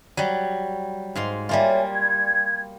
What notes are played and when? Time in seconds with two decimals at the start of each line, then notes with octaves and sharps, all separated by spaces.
0.17 F#3 G3
1.15 G#2 F5 C6
1.49 G3 A#3 F4 C#5 E5 G#5
1.93 G#6